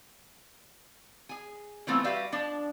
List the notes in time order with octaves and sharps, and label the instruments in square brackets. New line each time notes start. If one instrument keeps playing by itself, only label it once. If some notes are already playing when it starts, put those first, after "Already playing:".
[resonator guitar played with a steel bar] G#4 G#5
E3 G3 A3 B3 C4 F4
G3 F#4 G4 B4 E5 F5
F3 D4